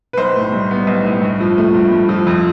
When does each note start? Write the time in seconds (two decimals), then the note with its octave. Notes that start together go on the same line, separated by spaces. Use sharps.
0.13 B4
0.17 B1 C5
0.36 A2
0.52 G3
0.71 B3
0.87 B1
1.05 A2
1.22 G2
1.40 F3
1.58 A3
1.74 G2
1.91 G2
2.09 F3
2.27 F2